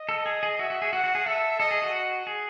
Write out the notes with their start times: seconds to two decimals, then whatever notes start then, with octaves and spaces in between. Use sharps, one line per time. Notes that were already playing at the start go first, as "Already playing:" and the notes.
Already playing: D#5
0.09 A4
0.26 G#4
0.43 G#4
0.59 F#4 E5
0.70 F#4
0.82 G#4
0.93 F#4 F#5
1.04 F#4
1.15 G#4
1.26 A4 E5
1.60 A4 D#5
1.71 G#4
1.82 F#4
2.27 G#4